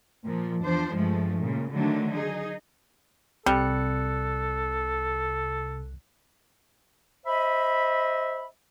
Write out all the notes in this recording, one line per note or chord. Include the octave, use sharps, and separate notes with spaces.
A#2 F3
E2 F3 D4 C5
G2 F3 G#3 A3
A#2 C#3
D3 D#3 F#3 A3 D4
D#4 G#4
C2 C3 G3 A4 F#6 C#7
C5 D#5 E5 B5